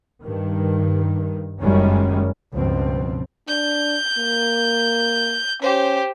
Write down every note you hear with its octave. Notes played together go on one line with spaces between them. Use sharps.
G2 D#3
F#1 F#2 D#3 G3 G#3 C#4
C#2 G2 B2 F3 C4
D4 G6
A#3
C#4 G4 C5